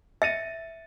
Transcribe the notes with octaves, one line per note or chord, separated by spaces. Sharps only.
E5 A6 C#7 D#7